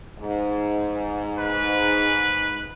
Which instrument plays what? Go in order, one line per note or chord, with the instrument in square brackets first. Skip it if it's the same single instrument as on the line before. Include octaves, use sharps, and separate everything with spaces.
[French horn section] G#2
[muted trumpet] B4